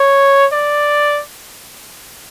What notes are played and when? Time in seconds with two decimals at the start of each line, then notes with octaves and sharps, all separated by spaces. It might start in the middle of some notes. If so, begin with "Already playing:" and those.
Already playing: C#5
0.52 D5